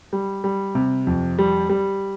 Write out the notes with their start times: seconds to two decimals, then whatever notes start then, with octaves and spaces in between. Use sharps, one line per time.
0.13 G3
0.44 G3
0.75 C3
1.07 F2
1.39 G3
1.69 G3